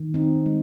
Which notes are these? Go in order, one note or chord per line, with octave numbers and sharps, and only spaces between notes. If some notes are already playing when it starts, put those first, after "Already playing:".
Already playing: D#3
C4 D#4
G#3